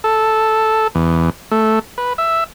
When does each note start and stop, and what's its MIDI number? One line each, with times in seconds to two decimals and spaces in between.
0.04 0.88 69
0.95 1.30 40
1.51 1.79 57
1.98 2.13 71
2.18 2.44 76